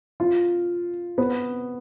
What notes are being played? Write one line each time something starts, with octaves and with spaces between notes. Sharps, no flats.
F4
B3